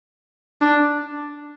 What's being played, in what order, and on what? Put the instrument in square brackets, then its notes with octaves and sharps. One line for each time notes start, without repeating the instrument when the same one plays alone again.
[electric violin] D4